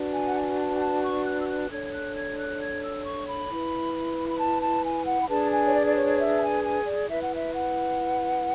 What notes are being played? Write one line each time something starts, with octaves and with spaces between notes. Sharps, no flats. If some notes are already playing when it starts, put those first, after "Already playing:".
Already playing: D4 F#4 B4
G#5
F#5
G#5
A5
G#5
A5
C#6
F#6
E6
F#6
D4 A4 C#5 G#6
G#6
F#6
G#6
F#6
G#6
E6
C#6
B5
E4 B4
B5
A5
A5
G#5
F#5
B5
D4 G#4 B4 A5
G#5
C#5
D5
D5
C#5
D5
E5
A5
G#5
G#5
D5
E4 B4 E5
F#5
E5
F#5